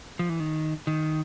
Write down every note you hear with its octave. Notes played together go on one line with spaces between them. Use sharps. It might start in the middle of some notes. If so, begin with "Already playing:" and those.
F3
E3
D#3
D#3